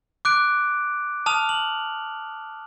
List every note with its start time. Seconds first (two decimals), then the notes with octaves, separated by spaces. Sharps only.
0.25 D6 F#6 D7
1.26 A5 D#6 F6 F7
1.49 F#7